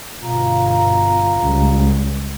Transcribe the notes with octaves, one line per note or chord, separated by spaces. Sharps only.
G1 B2 F4 A#5
C#2 C#3 G3